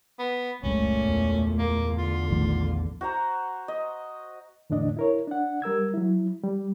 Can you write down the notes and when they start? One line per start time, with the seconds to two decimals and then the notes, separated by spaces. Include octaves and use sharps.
0.19 B3
0.63 F#1 C#2 A#2 C#3 A3 C#4
1.05 E2
1.59 A#3
1.98 D3 F4
2.31 A#1 D#3 A3
3.01 F#4 C5 A#5
3.68 D#5
4.70 E2 A2 D3 D4 D#5
4.97 E4 A#4 C#5
5.28 D4 F#5
5.62 G3 A#4 E6 G#6
5.94 F#3 E4
6.44 G3